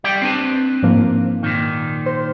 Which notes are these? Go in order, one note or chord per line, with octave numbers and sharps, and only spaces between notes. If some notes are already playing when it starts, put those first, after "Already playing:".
G3 D5 G5
C4 D4 B4
G#2 F3 A#3
A#2 D#3
C5